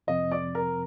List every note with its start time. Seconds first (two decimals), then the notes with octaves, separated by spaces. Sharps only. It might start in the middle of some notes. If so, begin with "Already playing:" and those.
0.07 F2 C3 F3 C4 D#5
0.31 D5 D6
0.55 A#4 A#5